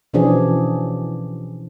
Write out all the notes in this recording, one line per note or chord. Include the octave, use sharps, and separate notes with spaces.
B2 E3 F3 C#4 D4 G#4